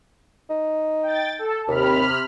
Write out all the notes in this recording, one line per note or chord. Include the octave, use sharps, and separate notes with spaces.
D#4
G5 A6
A4
D#2 C3 B5 F6